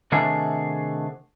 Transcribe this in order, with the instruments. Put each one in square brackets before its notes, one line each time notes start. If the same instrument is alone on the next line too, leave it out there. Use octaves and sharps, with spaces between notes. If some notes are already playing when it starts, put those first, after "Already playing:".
[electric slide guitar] C3 D#3 A3 D4 F#4 G#4